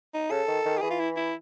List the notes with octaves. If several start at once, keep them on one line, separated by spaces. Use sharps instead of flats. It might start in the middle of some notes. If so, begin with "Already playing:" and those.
D#4
C#3 A4
D#3
D#3
G4
E3 G#4
F4
E4
E4